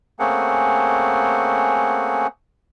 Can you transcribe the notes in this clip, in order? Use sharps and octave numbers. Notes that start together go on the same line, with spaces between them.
A3 A#3 C4 C#4 G#4 F#5